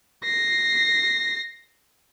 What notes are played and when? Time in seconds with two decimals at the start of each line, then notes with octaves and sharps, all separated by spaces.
0.24 A#6 C7